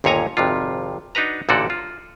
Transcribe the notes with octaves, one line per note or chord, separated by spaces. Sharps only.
G1 D#2 A#2 C#5 G#5 A#5
G#1 F2 C3 F4
D4 D#4 F#4 B4 A#5
A1 A#2 D3 F#4 A4 D5
F4